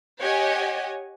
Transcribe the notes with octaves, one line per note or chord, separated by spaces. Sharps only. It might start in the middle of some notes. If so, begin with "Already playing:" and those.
G4 C#5 D#5 F#5 G#5